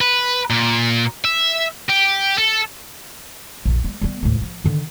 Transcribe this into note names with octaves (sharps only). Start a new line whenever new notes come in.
B4
A#2
E5
G4
A4
A#1 F2
G3 A3
G3 B3
D2 A2
F3
D3 D#3